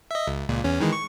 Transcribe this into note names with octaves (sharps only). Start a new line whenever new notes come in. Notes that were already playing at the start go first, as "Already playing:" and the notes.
D#5 E5
C#2
C#2 A#2
E2 C#4
D#3 E3 G#3
C#6